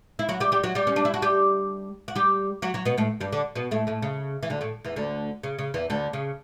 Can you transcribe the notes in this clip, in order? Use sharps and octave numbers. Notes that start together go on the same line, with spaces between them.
E4
F#3 F#4
G3 G4
G3 G4
F#3 F#4
G3 G4
C#4
D4
E4
F#4
G3 G4
F#4
G3 G4
F#3 F#4
F#3 F#4
B2 B3
A2 A3
G2 G3
D3 D4
B2 B3
A2 A3
A2 A3
C#3
E3
D2 D3
A2 A3
E2 E3
D2 D3
C#3
C#3
E2 E3
D2 D3
C#3